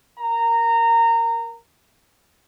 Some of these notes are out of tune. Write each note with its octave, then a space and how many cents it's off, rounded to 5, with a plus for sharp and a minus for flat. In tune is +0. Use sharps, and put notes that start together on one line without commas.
A#4 +0 A#5 -20